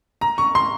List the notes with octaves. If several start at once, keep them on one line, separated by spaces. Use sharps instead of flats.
A#5
C#6
C6